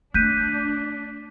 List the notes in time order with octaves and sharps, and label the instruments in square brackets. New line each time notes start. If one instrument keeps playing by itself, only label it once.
[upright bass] A3 [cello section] D4 [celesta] F#6 B6 D#7 [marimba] G6